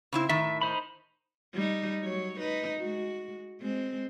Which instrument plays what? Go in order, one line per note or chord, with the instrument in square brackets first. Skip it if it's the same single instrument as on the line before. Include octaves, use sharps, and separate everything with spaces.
[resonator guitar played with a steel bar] C#3 C4 E4
[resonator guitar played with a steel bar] A2 D#3 [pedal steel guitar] E5
[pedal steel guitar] D#4 C5 B5
[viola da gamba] G3 D#4
F#3 C#5
D#4 B4
G#3 F#4
G#3 C4